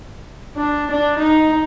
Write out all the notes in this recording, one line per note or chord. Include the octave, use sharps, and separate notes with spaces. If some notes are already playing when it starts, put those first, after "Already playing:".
D4
D4
D#4